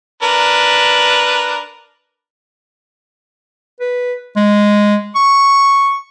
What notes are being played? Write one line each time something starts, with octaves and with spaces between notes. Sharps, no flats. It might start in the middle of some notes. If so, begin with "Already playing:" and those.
D4 A#4 B4
B4
G#3
C#6